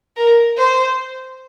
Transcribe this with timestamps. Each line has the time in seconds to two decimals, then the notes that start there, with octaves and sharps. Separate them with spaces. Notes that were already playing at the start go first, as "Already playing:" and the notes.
0.17 A#4
0.58 C5